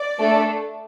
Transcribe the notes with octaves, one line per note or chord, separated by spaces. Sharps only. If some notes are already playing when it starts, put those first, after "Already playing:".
Already playing: D5
A3 D4 A4